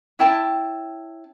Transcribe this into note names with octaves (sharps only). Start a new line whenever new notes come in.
C#4 E4 G5 A5